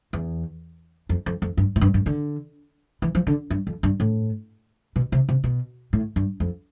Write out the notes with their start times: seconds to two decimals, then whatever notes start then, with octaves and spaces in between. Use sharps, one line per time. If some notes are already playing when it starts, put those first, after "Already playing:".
0.13 E2
1.09 F2
1.26 F2
1.42 F2
1.57 G2
1.76 A2
1.81 G2
1.94 G2
2.06 D3
3.02 E3
3.15 F3
3.27 D3
3.50 G2
3.67 F2
3.83 G2
4.00 A2
4.96 B2
5.12 C3
5.29 C3
5.44 B2
5.93 A2
6.16 G2
6.40 F2